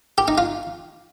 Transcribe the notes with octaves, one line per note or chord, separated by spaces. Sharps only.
G4
D#4
F4